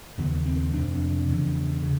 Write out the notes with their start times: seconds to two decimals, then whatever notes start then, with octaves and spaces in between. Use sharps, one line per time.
0.18 D#2 C#3 B3
0.46 C4
0.73 F2 C3 D4
1.29 E2 C#3
1.83 C#3